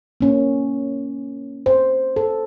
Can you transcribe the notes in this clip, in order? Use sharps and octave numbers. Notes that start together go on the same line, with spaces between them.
A#3 C#4
C5
A4